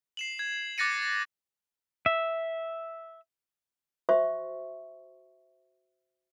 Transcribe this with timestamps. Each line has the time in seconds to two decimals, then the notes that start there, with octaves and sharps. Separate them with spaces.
0.17 C7 E7 F#7
0.39 G#6
0.78 D6 F#6 A6 A#6 C#7 D#7
2.06 E5
4.09 F#4 C5 E5 C6 C#6